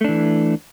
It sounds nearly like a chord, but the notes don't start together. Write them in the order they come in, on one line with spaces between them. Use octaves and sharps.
A3 D4 E3